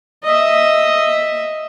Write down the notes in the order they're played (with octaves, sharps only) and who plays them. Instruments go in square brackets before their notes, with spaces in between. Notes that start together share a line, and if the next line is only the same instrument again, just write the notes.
[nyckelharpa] D#5 E5